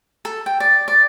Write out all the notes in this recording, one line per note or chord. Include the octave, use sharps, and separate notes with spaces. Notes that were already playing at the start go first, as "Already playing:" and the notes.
A4
G5
D5
D5